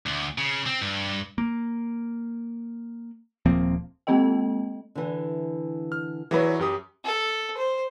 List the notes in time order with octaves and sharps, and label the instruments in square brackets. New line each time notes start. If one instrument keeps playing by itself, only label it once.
[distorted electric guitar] D2
C#3
C4
G2
[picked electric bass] A#3
D#1 F3 A#3 C4
[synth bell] G#3 A#3 C4 A4 D#5 G5
[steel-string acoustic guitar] D3 E3
[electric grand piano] F6
[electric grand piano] E3 F#3 B5 [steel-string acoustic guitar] G#4 B4 C#5
[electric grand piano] F#2 G4 D#6
[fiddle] A4
C5